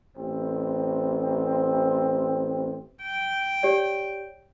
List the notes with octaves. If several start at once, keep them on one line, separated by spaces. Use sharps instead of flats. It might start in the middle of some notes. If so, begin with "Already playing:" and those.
A1 C4
G5
G4 C#5 D5